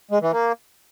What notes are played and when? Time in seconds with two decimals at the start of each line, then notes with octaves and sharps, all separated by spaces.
0.11 G#3
0.21 E3
0.32 A#3